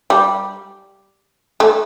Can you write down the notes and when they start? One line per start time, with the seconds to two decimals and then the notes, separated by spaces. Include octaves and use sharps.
0.10 G3
1.60 A3